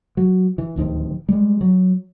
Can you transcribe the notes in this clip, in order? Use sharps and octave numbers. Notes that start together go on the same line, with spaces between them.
F#3
E3
D1 D#2 D#3 F3
G3 G#3
F#3